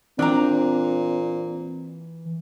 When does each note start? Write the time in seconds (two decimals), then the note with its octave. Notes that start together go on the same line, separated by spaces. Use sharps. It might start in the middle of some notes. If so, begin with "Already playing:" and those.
0.19 A#2 E3 C4 D4 G5 A#5